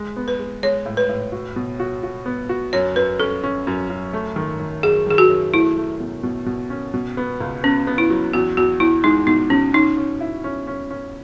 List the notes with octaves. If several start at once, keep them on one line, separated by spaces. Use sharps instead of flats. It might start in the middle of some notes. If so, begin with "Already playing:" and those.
Already playing: G#3
B3
B4
G#3
G#3 C#5
A2
B4
A2
F#4
B2
F#4
F#4
B3
F#4
F#2 C#5
F#2 B4
C#4 A4
C#4
F#2
F#2
A3
D#3
D#3
F#2 G#4
D#3 G#4
F#4
F#2
A3 E4
A3
B2
B2
B2
C#4
B2
B3
C#2
B3 C#4
B3
E4
F#3
E2 F#4
E2 F#4
E2 E4
G#3 D#4
B2 D#4
B2 C#4
C#4 D#4
C#4
E4
C#4
C#4
C#4